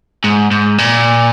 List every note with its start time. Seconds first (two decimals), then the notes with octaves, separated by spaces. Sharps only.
0.24 G#2
0.51 G#2
0.78 A#2